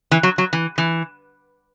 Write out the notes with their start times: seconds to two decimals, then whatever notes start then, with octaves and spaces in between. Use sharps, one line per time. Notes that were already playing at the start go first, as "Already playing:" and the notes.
0.11 E3
0.23 F#3
0.38 F#3
0.53 E3
0.78 E3